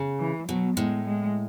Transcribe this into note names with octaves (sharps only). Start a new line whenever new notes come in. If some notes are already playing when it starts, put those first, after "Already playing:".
Already playing: C#3
E3
B2 F#3
A2 G#3
G#3